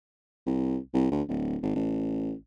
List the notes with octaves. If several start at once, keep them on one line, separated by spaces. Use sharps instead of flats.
C2
C2
D2
D1
G#1
A1